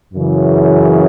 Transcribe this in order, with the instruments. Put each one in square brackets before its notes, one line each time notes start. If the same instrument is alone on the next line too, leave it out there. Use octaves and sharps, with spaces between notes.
[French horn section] F#2 C#3 E3